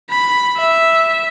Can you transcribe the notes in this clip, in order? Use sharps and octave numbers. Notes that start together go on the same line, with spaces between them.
B5
E5